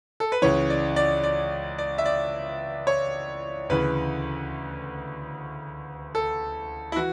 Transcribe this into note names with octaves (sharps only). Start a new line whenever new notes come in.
A4
B4
C#2 C#3 E3 C#5
D5
D5
D5
D5
E5
D5
C#5
D2 C#3 E3 B4
A4
E4
E3 F#4